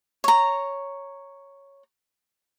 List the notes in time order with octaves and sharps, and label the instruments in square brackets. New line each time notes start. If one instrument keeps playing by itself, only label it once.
[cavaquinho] C#5 A#5